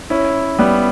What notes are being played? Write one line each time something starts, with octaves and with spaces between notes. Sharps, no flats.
C#4 E4
G3 B3